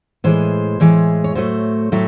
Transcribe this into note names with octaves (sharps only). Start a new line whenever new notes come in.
A2 E3 G#3 C5
A2 E3 G#3
C#5
A2 F#3 A3 C5
A2 F#3 A3